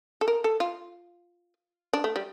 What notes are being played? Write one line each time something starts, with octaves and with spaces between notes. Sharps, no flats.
A4
A#4
A4
F4
D4
A3
G3